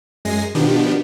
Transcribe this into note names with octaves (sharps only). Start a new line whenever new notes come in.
F#2 G#3 G#5 A#6 C7
B2 D#3 F3 B3 D4 G4